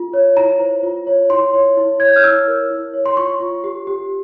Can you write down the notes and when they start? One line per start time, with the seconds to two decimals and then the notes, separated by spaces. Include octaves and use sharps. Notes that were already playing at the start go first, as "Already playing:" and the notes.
Already playing: F4
0.14 C#5
0.37 E4 A#5
0.60 C5
0.83 F4
1.07 C#5
1.30 E4 C6
1.53 C#5
1.77 E4
2.00 C#5 G#6
2.08 G6
2.16 F6
2.24 E4 E6
2.47 A#4
2.70 E4
2.94 C#5
3.06 C6
3.17 F4 C#6
3.40 F4
3.64 G4
3.87 G4